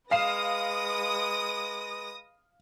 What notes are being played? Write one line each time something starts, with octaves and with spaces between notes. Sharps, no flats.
G#3 B4 F5 D#6 A#6 C7 E7